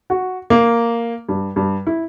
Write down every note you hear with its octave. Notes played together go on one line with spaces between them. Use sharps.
F#4
A#3
G2
G2
E4